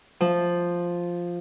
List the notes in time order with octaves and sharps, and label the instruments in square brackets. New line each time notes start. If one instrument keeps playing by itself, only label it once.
[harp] F3